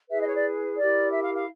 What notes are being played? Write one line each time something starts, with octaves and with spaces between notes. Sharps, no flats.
E4 G#4 B4 E5
D#5
C#5
D5
E4 G4 A#4 D5
E5
F5
F5